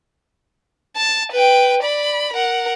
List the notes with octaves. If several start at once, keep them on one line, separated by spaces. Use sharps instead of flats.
A5
B4 G5
D5 B5
A#4 F#5